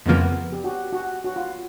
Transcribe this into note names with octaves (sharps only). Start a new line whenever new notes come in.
F2 C#3 F3 A#3 B3
G4
F#4
F#4
F#4
F4